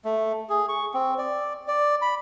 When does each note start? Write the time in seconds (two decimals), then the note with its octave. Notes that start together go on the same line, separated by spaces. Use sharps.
0.05 A3
0.49 G#4
0.69 C#6
0.94 C4
1.18 D5
1.68 D5
2.02 B5